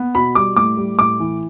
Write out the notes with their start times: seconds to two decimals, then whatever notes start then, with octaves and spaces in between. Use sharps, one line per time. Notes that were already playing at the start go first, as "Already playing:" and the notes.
Already playing: B3
0.15 B2 B5
0.35 G3 D6
0.56 A2 D6
0.77 G3
0.98 A2 D6
1.20 E3